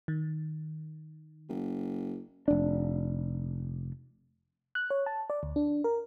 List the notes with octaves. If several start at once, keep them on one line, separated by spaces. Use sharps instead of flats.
D#3
F#1
F1 D4
F#6
C#5
A5
D5
D2
D4
A#4